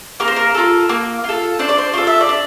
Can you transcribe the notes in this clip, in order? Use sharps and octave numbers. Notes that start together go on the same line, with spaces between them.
A#3 A#4
C5
A#4
F4 A4
A#3
F4 A4
D4 C5
D5
C5
F4 A4 D5
E5
D5
D4